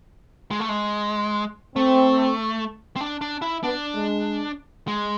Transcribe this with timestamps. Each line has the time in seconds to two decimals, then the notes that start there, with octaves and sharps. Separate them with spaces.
0.51 G#3
0.60 A3
0.69 G#3
1.75 A3 C4
2.96 C4
3.01 D4
3.21 D4
3.42 E4
3.63 B3 D4
3.95 G#3
4.88 G#3